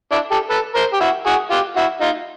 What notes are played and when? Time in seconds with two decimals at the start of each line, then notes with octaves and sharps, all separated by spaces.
0.11 D4 E4
0.31 G4 A4
0.49 A4 B4
0.75 A#4 C5
0.93 G4
1.00 E4 F#4
1.26 F#4 G#4
1.50 F4 G4
1.76 E4 F#4
2.01 D#4 F4